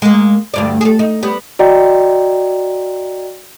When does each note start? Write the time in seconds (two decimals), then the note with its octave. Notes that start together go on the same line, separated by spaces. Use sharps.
0.02 G#3 A#3
0.54 D2 G2 D5
0.81 G#4 A4
0.99 D#4
1.23 G3 B3
1.59 F#4 D5 D#5 G5 A#5